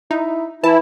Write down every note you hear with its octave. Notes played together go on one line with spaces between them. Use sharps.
D#4 E4
E3 E4 A5